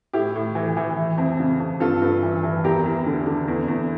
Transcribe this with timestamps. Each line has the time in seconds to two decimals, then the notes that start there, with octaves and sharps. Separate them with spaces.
0.13 A2 E4 G4
0.36 A2
0.55 E3
0.77 E3
0.97 E3
1.18 F2
1.40 C#3
1.60 F2
1.80 G2 F4 A4
2.02 G2
2.23 E3
2.43 E3
2.64 E2 G4 A#4
2.86 E2
3.07 D3
3.26 D3
3.48 E2
3.68 E2